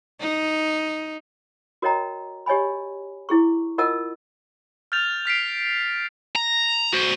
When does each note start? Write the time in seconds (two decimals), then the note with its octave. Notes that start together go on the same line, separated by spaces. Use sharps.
0.21 D#4
1.82 F#4 A#4 C#5 D#5 G5 A#5
2.46 G4 C#5 D#5 G#5 B5
3.29 E4 G#4 C#6
3.78 F4 A#4 D#5 F#5 A5 E6
4.92 F6 G6 A6 F7
5.26 F6 B6 C7 D7
6.35 A#5
6.93 F#4 C5